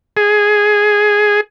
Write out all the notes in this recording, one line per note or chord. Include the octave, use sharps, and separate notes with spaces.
G#4